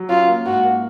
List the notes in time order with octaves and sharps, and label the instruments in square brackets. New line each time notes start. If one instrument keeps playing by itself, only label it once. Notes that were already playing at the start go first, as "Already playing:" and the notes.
Already playing: [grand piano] F#3
[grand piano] C#4 [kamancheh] F4
[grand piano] A#3
[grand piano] G#2 [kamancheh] F#4
[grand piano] A#3